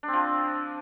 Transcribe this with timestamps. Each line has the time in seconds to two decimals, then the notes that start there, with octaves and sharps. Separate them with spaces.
0.03 D4
0.08 C4
0.13 F3